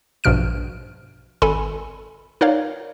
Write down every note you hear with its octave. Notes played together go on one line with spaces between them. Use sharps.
A#1 G2 B2 F6 D7
G#1 A4 G#5 B5
D#4 A#4 C#5 D5 F5